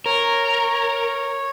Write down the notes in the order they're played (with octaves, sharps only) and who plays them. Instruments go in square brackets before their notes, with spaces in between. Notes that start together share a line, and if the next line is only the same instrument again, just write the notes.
[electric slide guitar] A#4 [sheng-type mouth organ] C#5